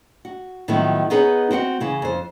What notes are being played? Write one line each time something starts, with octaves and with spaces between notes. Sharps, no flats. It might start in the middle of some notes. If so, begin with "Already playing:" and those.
F#4
A2 D#3 F3 F#3 B3 E4
B3 D#4 G#4 B4 C#5
C4 F#4 F5 F#5
C#3 E3
F2 C5